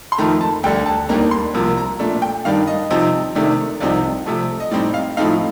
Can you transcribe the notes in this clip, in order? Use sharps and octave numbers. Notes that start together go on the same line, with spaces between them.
C6
F2 D#3 A3 A#5
A5
D2 D3 G3 G5
A5
D#2 D#3 G3 A#3 D4 A#5
C6
C2 C3 F3 A#3
A#5
A#2 A3 D4
G5
G2 D#3 G3 D4 F5
D#5
C3 F3 C4 D#4
C3 D#3 A3 D4
C2 C3 F3 C4 D#4 D5
C3 F3 A3
D#5
A2 G3 C4 D#4 D5
F5
A2 F3 A3 C4 D#4 F5